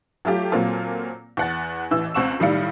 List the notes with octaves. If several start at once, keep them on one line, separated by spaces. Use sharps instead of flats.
F#3 A3 F4 G4
A#2 F#3 A#3 C4 F4 A4
E2 F#5 A6
A1 E3 E6
C#2 C4 F#5 C#6 E7
B1 A2 D#3 G3 F5 C#7